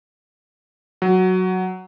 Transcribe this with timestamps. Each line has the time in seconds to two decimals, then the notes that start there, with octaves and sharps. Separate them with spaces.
1.02 F#3